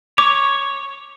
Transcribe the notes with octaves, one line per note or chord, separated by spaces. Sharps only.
C#5 D6